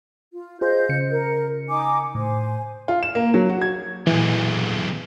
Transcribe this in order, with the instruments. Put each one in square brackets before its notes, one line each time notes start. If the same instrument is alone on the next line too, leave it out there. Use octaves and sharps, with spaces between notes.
[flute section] F4
[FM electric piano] F4 G#4 C5 [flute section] D#5 F5 G6
[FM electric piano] C#3 C#7
[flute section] A#4
D#4 G#5 D6
[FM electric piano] A2 [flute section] C5 G#5
[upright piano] F4
E7
A#3
F#3
F#4
G#6
[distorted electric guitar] B1 E2 [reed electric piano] A#2 E3